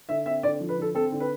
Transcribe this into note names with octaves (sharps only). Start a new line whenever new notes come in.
D3 E5
C4 E5
D3 D5
F3
B4
D3 A4
C4 A4
D3
B4